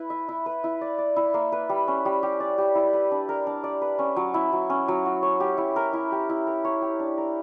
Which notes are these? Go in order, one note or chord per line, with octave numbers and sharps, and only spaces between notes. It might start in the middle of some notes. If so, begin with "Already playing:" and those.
Already playing: E4 B4
E5
E4
B4
E4
D5
D5
E4
A#3
B4
G3
C#4
G3
G4
D5
G4
E4
B4
D4
A#4
D4
D5
B4
C#4
F#3
E4
F#3
C#4
F#3
F#4
C#5
G4
E4
A#4
E4
G4
E4
A#4
C#5
G4
D4
A#4